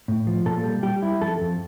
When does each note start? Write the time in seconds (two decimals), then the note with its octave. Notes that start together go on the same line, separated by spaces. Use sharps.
0.08 A2
0.27 F3
0.45 A#2 A4
0.64 G3
0.83 G3 G4
1.02 E4
1.21 F2 A4
1.40 F2